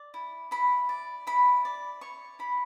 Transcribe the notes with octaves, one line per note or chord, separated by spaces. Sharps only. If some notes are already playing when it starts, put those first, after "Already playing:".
Already playing: D5
E4
E4 B5
D5
E4 B5
D5
C#5 C#6
E4 B5